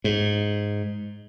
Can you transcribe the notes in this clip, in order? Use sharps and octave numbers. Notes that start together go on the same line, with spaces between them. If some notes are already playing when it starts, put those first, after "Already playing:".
G#2